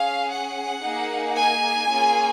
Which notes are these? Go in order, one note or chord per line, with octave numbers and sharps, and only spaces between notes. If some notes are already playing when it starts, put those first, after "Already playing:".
Already playing: C#4 G#4 F5
F#5
A#3 D#4 G#4
G#5
A#3 C#4 F4 G#4